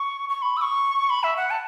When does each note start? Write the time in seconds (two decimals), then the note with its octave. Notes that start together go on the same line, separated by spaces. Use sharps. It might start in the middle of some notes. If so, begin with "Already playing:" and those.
Already playing: C#6
0.29 C#6
0.42 B5
0.57 E6
0.61 C#6
1.10 B5
1.24 E5
1.37 F#5
1.51 A5